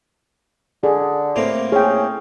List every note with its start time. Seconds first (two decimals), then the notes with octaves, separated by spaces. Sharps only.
0.83 D3 G#4
1.36 A2 A#3 C4
1.72 C#4 G#4 G5